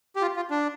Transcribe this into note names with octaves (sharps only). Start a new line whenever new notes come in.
G4
F4
F4
D4